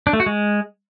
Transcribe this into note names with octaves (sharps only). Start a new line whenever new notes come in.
D4
A3
F#4
G#3